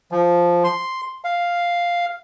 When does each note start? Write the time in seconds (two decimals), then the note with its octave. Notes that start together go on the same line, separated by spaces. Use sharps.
0.12 F3
0.64 C6
1.24 F5